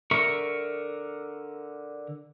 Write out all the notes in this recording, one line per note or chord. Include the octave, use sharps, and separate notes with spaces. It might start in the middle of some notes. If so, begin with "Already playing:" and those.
D3 A#4 E5 C#6